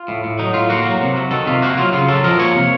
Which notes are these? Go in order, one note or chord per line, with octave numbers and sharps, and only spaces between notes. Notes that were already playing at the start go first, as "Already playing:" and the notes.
Already playing: F4
A2
A2
F#3 D#4
A2 F4
A#3 F#4
F#3
C3
F#3
D#3 A4
C3 F4
A#3 F#4
F#3 F4
C#3 F4
F#3 A4
F3 A#4
A#3 C#5
C3